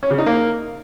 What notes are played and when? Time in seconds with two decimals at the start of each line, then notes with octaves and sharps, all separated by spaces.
0.03 C#4
0.11 C#3
0.18 D#4
0.26 A#3